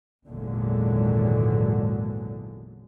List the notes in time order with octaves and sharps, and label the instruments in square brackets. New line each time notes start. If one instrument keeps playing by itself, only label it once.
[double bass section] G#1 E2 A#2 D3 F#3 G#3